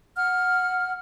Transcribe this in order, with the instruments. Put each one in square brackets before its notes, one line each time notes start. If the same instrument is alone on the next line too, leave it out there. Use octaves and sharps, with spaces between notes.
[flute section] F#5 F6